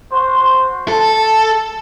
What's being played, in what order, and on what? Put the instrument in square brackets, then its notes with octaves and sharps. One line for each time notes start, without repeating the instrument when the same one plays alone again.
[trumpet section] F#4 C5
[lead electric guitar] A4 [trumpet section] A5